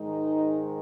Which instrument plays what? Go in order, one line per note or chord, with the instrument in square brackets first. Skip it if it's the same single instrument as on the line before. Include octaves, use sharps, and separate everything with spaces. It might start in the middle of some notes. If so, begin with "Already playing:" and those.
Already playing: [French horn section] G#2 D#3 G#3 D#4